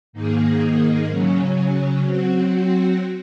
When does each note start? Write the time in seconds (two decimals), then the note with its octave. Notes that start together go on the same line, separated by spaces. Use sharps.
0.13 G#2 D#3 A#3 D#4 G#4
1.08 C#3 F#3 C#4
2.02 F#3 C4 F#4